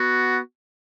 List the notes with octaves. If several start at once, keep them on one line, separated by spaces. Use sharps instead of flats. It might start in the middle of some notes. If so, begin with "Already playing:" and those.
Already playing: B3 F#4